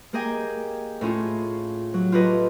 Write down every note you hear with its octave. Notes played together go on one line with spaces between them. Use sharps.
A#3 G4 G#4 D#5 G5 G#5
A2 C#4 F4 G#4
F#3
F4 G4 A4 B4 C#5 D#5